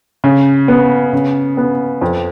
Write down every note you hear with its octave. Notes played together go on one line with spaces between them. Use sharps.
C#3
B3
C#3
B3
F2